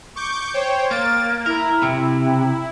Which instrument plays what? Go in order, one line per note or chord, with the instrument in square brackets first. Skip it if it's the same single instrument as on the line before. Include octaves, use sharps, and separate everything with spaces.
[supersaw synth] C#6 D6 G6
C5 C#5 G5
[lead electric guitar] A#3 [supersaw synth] A6
[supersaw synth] E4 [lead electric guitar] A#4
[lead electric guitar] C3